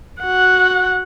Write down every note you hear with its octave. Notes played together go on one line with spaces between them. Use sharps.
F#4 F#5